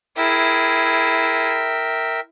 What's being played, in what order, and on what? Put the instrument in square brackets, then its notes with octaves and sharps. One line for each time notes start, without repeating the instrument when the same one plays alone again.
[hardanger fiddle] E4 G#4 [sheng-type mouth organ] A#4 E5 G5